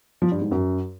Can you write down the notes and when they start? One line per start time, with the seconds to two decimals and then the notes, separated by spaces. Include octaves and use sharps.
0.22 F3
0.32 G2
0.42 G#2
0.51 F#2